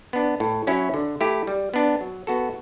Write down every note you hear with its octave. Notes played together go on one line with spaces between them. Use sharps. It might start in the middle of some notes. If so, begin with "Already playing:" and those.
B3 D4
A2
F#3 C#4 E4
D3
A3 E4 G4
G3
B3 D4
F#3
B3 F#4 A4